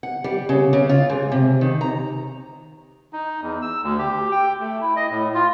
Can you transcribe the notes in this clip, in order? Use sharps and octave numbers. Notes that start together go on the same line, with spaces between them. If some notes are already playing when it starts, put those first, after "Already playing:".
F#5
G3
C#3
C#3
F4
G#2
C3
D#3
A#5
D#4
E2
E6
D2
G4
G5
A3
E4
D#5
A2
F4